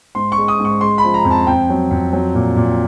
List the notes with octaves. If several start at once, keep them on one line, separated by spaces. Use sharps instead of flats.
G#2 C6
C#6
G#3
D#6
G#2
C#6
G#3 C6
B5
F3
A#5
F2
A5
F2 G5
F#3
F2
F#3
A#2
A#2